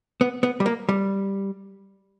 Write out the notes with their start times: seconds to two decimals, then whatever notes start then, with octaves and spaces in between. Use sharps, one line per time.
0.21 B3
0.43 B3
0.60 G3
0.66 A#3
0.89 G3